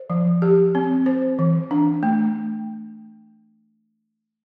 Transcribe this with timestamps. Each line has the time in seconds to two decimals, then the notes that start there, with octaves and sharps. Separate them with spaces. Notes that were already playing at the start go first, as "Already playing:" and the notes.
Already playing: C5
0.10 F3
0.42 G4
0.75 C4
1.06 C5
1.39 E3
1.71 D4
2.03 A3